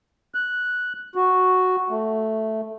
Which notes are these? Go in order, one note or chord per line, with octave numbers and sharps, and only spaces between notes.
F#6
F#4
A3